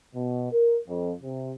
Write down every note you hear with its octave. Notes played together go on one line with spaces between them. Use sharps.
B2
A#4
F2
C3